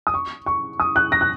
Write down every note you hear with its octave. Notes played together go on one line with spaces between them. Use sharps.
D#6
C#6
C#6
D#6
F#6
A#6
F#6